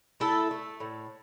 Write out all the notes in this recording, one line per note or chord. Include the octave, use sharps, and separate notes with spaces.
A3 E4 A4
A3
A2